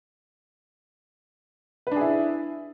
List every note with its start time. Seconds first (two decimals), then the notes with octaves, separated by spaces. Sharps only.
1.87 B4
1.91 D4
1.96 G#4
2.01 E4